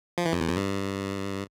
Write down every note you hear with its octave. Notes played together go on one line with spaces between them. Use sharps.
F3
E3
F2
E2
F2
G2